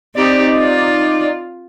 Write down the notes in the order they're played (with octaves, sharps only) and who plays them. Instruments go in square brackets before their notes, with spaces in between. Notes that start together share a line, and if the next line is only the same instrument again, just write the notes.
[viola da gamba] C4 G4 [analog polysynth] D#4 D5
[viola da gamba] F4